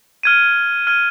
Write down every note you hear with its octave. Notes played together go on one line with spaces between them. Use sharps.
F6 G#6 D#7
F6 G#6 D#7